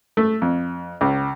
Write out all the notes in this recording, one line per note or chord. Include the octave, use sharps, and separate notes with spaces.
A3
F2
C#2